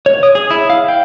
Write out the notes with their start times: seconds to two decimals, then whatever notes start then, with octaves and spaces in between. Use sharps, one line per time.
0.06 C#5
0.23 D#6
0.35 G#4
0.51 E4
0.70 F5
0.88 G5